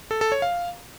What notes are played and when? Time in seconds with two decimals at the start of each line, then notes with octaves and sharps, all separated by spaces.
0.11 A4
0.21 A4
0.32 C#5
0.42 F5